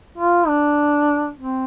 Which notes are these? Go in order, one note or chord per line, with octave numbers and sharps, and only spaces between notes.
F4
D4
C4